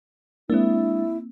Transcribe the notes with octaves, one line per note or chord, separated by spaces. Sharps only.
G#3 A#3 C4 D4 E4